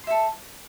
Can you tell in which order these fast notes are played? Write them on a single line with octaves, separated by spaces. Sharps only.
C6 E5 A4